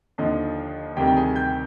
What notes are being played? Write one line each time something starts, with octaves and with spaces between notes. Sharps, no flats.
D#2 D3 F3 D#5
D2 C3 D#3 G3 G4 G5
G5
G#4 G#5
G5 G6